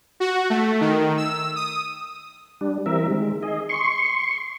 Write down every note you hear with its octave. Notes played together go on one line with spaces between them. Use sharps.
F#4
A3
D#3
E6
D#6
G3 D4
E3 G3 C4 A#4 E5
D#3 G#3
G#4 D#5
C6 C#6